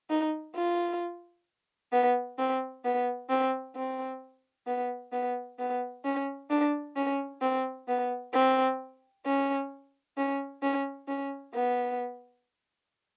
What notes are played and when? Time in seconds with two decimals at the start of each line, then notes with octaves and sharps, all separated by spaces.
0.10 D#4
0.55 F4
1.92 B3
2.39 C4
2.85 B3
3.30 C4
3.76 C4
4.67 B3
5.13 B3
5.59 B3
6.05 C#4
6.50 D4
6.96 C#4
7.42 C4
7.88 B3
8.34 C4
9.26 C#4
10.18 C#4
10.62 C#4
11.08 C#4
11.55 B3